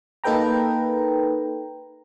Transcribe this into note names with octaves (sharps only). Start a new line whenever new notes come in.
A#3 D#4 A4 B4 G5 A#5